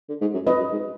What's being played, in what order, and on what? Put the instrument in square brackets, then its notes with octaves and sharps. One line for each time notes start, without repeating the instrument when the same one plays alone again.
[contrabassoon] D3
G#2
F#2
[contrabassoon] F2 [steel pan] B4 D#5
[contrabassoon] F#2
G#2